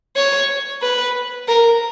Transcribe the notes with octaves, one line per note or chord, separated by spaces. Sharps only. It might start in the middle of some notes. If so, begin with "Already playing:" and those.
C#5
B4
A#4